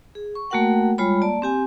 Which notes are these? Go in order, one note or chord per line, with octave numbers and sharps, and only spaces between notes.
G#4
C#6
A3 A#3 F#4 A#4 F#5 G5
G3 G#3 F4 C#5 B5
A#3 D5 A5
C4 G4 G#5